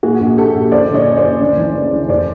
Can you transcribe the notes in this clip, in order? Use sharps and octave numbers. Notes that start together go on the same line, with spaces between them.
A#2 F#4 G#4
A#1
A#2 G4 A4
A#1
F#1 C5 D5
D3 C#5 D#5
F#2
C5 D5
F#1
D2
E3
C#3
D2
F1 C5 D5